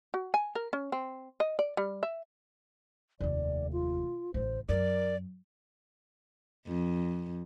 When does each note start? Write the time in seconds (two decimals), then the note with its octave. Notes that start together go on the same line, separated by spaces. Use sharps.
0.14 F#4
0.34 G#5
0.55 A#4
0.73 C#4
0.92 C4
1.40 D#5
1.59 D5
1.77 G3
2.03 E5
3.21 F1 D#2 D5
3.73 F4
4.34 A1 C#3 C5
4.69 F#2 A#4 D5
6.67 F2